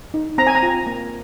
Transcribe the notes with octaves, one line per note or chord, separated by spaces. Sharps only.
D#4
C4 A#5
G#5
A#5
F4
A#3